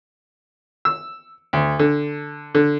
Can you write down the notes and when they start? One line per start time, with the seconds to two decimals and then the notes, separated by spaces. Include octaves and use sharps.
0.85 E6
1.53 D2
1.79 D3
2.55 D3